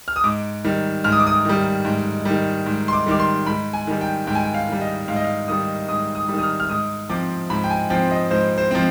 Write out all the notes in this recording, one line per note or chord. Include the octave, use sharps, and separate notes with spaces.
F6
D#6
G#2 D6
D#3 G3
G#2 F6
D#6
D6
D#6
D#3 G3
G#2
D#3 G3
G#2
C6
D6
D#3 G3 D6
C6
G#2 B5
G#5
D#3 G3
G5
G#2 G5
G#5
G5
F5
D#3 G3
D#5
G#2 F5
D#5
F5
D#3 G3 D#6
G#2 D#6
D#6
D#3 G3
D#6
F6
F6
G#2 D#6
F3 C4 D6
G#2 B5
G5
G#5
F3 C4 G5
D#5
G#2 C5
C5
F3 C4